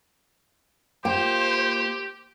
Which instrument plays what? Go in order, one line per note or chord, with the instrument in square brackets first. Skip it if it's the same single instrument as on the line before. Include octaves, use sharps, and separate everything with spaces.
[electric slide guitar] A#3 F4 [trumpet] G4 [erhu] C5 [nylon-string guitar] G5